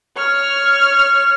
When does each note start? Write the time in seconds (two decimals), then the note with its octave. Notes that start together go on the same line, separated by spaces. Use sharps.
0.17 C#5 F6